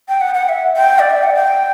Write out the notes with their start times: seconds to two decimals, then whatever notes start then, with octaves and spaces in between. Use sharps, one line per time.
0.09 G5
0.21 F#5
0.34 F#5
0.49 E5
0.77 G5
0.99 D5
1.10 E5
1.23 F#5
1.34 G5